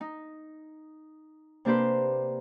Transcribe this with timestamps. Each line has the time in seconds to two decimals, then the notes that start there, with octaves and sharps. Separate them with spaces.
0.01 D#4
1.65 C3 A#3 D4 G4 B4 C5